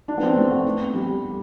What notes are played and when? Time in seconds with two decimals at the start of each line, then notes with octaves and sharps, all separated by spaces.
0.08 D4
0.18 B3
0.23 C4
0.36 A3
0.51 B3
0.94 G3